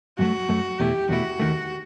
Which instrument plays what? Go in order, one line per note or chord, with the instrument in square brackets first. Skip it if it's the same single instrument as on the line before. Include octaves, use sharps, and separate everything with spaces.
[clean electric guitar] F#2 F#3 A3 [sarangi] F#4
[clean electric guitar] F#2 F#3 A3
[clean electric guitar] E2 B2 A3 E4 [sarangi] G4
[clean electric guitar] E2 B2 A3 E4 [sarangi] F#4
[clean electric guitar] D#2 D#3 A3